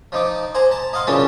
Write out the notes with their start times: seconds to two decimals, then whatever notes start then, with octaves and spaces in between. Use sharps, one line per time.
0.12 F3 D#4 D6
0.55 C5 F#5 G#5 A#5
0.71 A5 A#5
0.93 D#5 F5 F#5 C6
1.07 F#2 C#3 E3 C#4 D4 F4